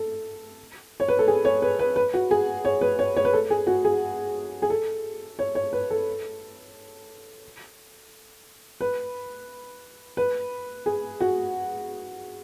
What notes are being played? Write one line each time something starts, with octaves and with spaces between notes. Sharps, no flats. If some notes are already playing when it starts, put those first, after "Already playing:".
Already playing: A4
C#5
B4
A4
G#4
C#5
B4
B4
B4
F#4
G#4
C#5
B4
C#5
C#5
B4
A4
G#4
F#4
G#4
G#4
A4
C#5
C#5
B4
A4
B4
B4
G#4
F#4